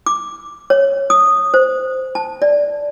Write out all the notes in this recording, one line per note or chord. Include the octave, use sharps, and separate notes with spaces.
D6
C#5
D#6
C5
A5
D5